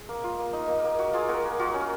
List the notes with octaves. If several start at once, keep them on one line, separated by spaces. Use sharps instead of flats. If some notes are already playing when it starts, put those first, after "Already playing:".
Already playing: G#4
A#3
F4
A#3
D#4
A#3
A#3
A#3 F#4
A#3 F4 G#4
A#3 F#4 A#4
A#3
F4 F#4
C#4